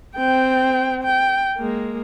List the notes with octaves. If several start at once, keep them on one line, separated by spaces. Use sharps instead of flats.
C4 G5
G5
G#3 A#3